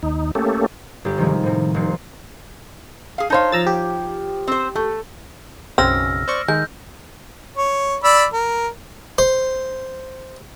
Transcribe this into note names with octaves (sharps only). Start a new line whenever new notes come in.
D#2 D#4
A3 A#3 C#4 G4 A4
G1 G4
C3 D#3 F3 G#3
A2 C3
F1 A#3 C4 C#7
G#4 F5
D#4 C5 C#5 F5 A5
F3 A#5 E6 A6
G4
C4 C5
A3 A4
B1 F#2 C#3 C4 E6 F6 A#6
C5 D5 C#6
D#3 G#3 G6
C#5
D5 B5 E6
A#4
C5